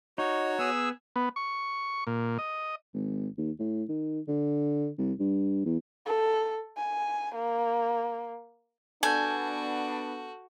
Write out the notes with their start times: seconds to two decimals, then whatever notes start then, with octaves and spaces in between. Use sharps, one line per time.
0.18 D#4 F#4 C#5
0.59 B3 G#4 G#5 E6
1.16 B3
1.36 C#6
2.07 A#2
2.38 D#5
2.94 G#1
3.38 D#2
3.59 A2
3.89 D#3
4.28 D3
4.98 C2
5.19 G2
5.65 E2
6.06 A4
6.77 G#5
7.35 A#3
9.03 B3 D4 F#4 A4 G#5 A5 G6